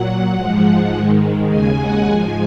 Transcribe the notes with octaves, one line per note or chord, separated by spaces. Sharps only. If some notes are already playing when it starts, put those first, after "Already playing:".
Already playing: A#2 F#3 F#5
G#2 F3 G#3
G#2 D#3 G#3
D#2 C#3 G#3 G#5
F#5
G#2 F3 G#3 G#5